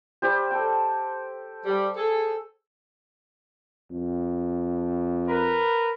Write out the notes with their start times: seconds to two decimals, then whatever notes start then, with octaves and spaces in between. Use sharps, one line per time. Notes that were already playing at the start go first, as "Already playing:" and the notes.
0.22 G3 G4 C5
0.51 A4 G5
1.66 G3
1.97 G#4 A4
3.90 F2
5.28 A#4 B4